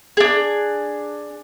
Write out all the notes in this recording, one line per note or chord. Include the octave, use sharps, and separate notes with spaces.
D4 G#4